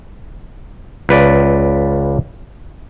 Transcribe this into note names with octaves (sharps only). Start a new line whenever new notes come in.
C#2 B4 D5